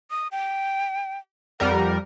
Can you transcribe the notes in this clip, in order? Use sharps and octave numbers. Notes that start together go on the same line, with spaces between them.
D#6
G5
F2 G3 A#4 F#5